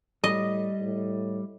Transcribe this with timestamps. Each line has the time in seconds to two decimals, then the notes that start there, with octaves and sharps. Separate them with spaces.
0.24 A2 G3 D#5
0.81 A2